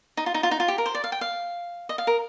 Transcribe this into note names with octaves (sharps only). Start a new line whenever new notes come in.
D#4
F4
D#4
F4
D#4
F4
G4
A#4
C5
D5
F5
G5
F5
D#5
F5
A#4